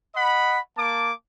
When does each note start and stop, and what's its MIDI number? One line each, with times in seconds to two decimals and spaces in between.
0.15 0.58 75
0.15 0.58 78
0.15 0.58 83
0.77 1.12 58
0.77 1.12 81
0.77 1.12 86